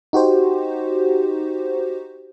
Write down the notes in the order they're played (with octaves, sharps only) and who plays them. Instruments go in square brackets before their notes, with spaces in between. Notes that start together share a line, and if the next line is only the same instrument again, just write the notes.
[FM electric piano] D#4 F#4 G4 C5